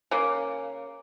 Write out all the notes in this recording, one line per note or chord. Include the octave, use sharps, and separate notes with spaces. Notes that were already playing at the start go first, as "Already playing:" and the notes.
C#3 A#3